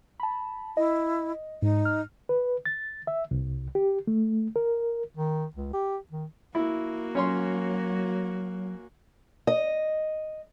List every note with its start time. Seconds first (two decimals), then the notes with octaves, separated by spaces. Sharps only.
0.20 A5 B5
0.77 E4 D#5
1.62 G#2 D#4
1.85 F6
2.29 B4
2.65 A6
3.07 E5
3.31 C2
3.75 G4
4.07 A3
4.56 A#4
5.17 D#3
5.56 C#2
5.74 G4
6.11 D#3
6.55 A#3 E4 F#4
7.15 F#3 C#4 C#5 C6
9.47 D#5